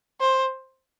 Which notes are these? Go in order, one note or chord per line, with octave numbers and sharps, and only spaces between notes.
C5